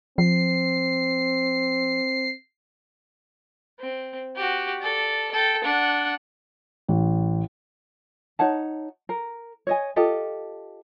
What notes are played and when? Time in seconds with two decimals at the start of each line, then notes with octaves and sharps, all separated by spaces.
0.18 F3 C4 C7
3.79 C4
4.36 F#4 G4
4.81 A4 D5
5.31 A4 G5
5.64 D4 F#5
6.88 A1
8.39 D#4 C#5 F#5 A5
9.09 A#4
9.67 C#5 D#5 G#5
9.96 F4 G4 A4 D#5